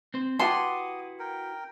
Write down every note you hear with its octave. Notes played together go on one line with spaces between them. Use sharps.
C4 C5
E4 F#4 G4 B4 F#5 A5 C6 D#6
A#4 G5